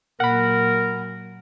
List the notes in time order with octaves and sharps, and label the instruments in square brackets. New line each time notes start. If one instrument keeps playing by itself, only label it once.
[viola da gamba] A#2 F#3 [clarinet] A#4 [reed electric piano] F#5 B5